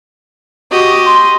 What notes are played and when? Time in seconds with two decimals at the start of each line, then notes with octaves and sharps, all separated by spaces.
0.71 F#4 G4 D#5
1.06 C6